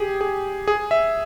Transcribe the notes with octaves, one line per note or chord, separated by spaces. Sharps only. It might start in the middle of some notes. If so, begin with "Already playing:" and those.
Already playing: G4 G#4
G#4
G#4
E5